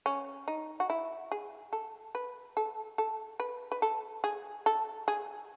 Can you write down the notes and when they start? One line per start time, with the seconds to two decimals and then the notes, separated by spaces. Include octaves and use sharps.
0.06 C#4
0.48 D#4
0.80 F#4
0.90 E4
1.32 G#4
1.73 A4
2.15 B4
2.57 A4
2.98 A4
3.40 B4
3.72 B4
3.82 A4
4.24 G#4
4.66 A4
5.08 G#4